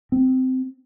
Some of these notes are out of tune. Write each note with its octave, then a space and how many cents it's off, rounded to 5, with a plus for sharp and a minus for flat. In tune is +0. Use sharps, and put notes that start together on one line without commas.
C4 -15